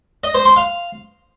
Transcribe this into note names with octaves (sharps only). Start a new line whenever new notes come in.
D#5
C5
C6
F5